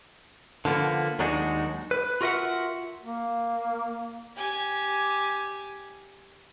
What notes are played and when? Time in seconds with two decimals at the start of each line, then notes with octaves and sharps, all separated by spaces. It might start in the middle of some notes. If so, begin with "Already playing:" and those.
0.65 D3 F3 A#3 B3
1.19 D#2 F#3 G#3 D4 D#4 F#4
1.91 B4
2.21 F4 F#4 A#4 D#5 E5 F#5
3.03 A#3
4.37 G4 G#5